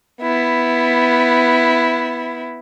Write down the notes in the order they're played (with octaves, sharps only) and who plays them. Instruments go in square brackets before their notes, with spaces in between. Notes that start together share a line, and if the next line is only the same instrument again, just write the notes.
[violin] B3 E4